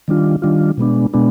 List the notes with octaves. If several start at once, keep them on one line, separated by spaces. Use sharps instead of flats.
D#3 G3 D4 F4
D#3 G3 D4 F4
B2 G#3 B3 D4
B2 G#3 B3 D4